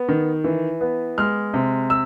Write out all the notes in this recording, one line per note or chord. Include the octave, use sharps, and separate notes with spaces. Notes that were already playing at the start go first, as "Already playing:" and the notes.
Already playing: B3
D#3
E3
B3
G#3 F6
C3
E6